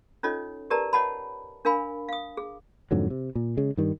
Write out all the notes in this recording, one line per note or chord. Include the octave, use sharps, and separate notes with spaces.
C#4 D#4 F4 A4 C#5 D#5
G4 A#4 B4 D5 A5 A#5
C#5 D#5 F#5 A5 B5
D4 A#4 F5 G#5 B5
F5 D#6
G#4
F2 G#2 D3 F#3
C3
A#2
C#3 G#3
G2 D#3 G3